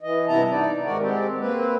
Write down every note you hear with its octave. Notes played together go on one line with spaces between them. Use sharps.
E3 D#5
G2 C3 B3 E4 A5 A#5
D#4 D5
G#2 D#3 F#4 A#4 D5
G#3 C4 G4
A#3 C4 B4